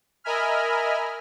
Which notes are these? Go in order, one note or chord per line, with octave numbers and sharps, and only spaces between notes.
A#4 D#5 E5 G#5 B5 F6